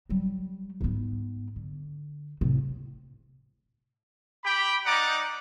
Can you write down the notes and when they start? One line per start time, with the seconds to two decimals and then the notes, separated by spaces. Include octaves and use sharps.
0.09 F#3 G3
0.81 G#2 B3
1.56 D3
2.41 A2 C3
4.44 G4 G5 B5
4.86 G3 D#4 D5 F#5 A#5 D6